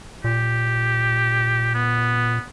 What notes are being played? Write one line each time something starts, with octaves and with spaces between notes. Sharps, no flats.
A#2 G4
B3